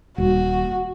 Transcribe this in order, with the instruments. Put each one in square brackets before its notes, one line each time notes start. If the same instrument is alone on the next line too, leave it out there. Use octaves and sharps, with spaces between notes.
[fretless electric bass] D#1 [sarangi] F#4